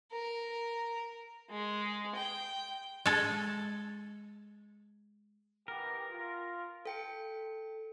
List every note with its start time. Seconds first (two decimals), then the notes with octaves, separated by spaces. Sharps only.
0.12 A#4
1.50 G#3
2.16 G5
3.06 G#3 A4
5.68 E3 B3 G4 A#4
6.11 F4
6.86 A4 G5 C#7